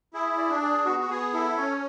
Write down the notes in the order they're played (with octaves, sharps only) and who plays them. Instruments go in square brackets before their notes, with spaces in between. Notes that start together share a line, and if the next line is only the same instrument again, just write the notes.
[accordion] E4 [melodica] G#4
[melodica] D5
[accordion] D4
[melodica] G#4
[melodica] B3 [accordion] F#4
[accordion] F#4
[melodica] B3 [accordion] G#4
[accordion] E4 [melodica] A4
[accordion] C#4 [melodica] C#5